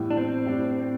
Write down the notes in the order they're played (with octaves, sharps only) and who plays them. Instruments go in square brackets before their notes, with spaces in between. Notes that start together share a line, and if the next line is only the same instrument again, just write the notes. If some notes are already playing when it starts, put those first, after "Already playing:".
Already playing: [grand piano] A2 E3 G3 B3 E4
[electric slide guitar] D4
C4
[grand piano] A2 G3 D4